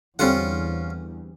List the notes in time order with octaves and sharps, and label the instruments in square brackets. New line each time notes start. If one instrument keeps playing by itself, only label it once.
[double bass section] E2 [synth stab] D3 G3 C4 [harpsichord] C#4 F4 F#5